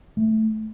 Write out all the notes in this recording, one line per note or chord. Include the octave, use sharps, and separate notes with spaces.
A3